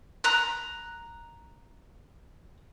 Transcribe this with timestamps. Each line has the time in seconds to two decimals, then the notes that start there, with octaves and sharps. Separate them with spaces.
0.24 A#5 F#6